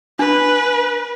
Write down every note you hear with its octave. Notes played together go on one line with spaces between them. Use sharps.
D4 B4 B5